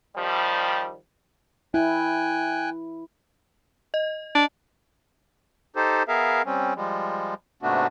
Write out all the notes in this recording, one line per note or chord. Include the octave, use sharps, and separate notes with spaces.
D#3 F3 G3
E4 G5 G#5 F#6
D#5
D4
D#4 G4 A4 C5
B3 G#4 A#4 E5 F5
G3 C4 C#4
F3 G3 G#3
G#2 C3 A3 B3 D4 F#4